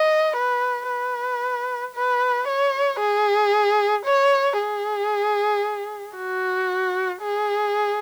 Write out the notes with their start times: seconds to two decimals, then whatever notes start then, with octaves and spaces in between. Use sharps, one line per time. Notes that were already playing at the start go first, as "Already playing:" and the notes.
Already playing: D#5
0.36 B4
0.89 B4
1.95 B4
2.48 C#5
3.00 G#4
4.06 C#5
4.59 G#4
6.16 F#4
7.23 G#4